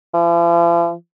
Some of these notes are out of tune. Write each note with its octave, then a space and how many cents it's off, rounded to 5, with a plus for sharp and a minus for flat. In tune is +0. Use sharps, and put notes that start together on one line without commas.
F3 -45